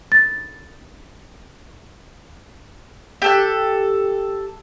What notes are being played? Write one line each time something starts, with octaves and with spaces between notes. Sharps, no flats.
A6
G4 A4 F#6